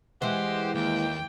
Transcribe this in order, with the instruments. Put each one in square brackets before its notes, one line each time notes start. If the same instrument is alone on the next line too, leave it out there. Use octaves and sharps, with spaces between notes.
[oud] E3 G#3 [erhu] G4 [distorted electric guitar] C5 [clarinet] F#5
[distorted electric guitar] D#2 [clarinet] A#3 [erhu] G5